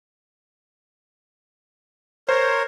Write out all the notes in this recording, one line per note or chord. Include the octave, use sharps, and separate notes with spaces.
A#4 C5 C#5